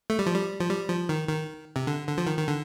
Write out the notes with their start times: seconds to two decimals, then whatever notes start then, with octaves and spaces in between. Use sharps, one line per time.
0.10 A3
0.19 G3
0.26 F3
0.35 G3
0.60 F3
0.70 G3
0.89 F3
1.09 D#3
1.29 D#3
1.76 C3
1.87 D3
2.07 D3
2.18 F3
2.27 D#3
2.37 D#3
2.47 D3